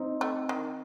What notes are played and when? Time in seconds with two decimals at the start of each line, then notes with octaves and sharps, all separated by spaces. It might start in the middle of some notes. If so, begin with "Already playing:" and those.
Already playing: C4 D#4
0.21 A3
0.49 D#3